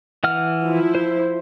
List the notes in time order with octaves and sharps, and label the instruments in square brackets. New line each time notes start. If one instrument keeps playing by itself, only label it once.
[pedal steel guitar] E3 F#5 F6
[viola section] F3 E4
[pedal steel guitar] C5